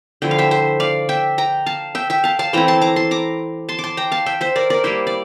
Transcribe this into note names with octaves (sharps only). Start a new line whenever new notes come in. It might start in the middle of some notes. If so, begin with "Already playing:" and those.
D3 F3 A3 E4 G5
F5
E5 G5
C5 E5
D5 F5
E5 G5
G5 A#5
F5 A5
E5 G5
E5 G5
F5 A5
F5 A5
E3 A3 C4 E4 G5 A#5
A5 C6
A#5 D6
A5 C6
A#5 D6
A5 C6
D6
A5 C6
G5 A#5
F5 A5
E5 G5
C5 E5
A#4 D5
A#4 D5
G3 A#3 E4 C5 E5
D5